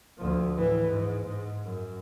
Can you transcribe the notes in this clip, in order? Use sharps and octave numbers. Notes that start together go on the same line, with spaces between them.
D2 F3
A2 E3
G#2
G#2
F#2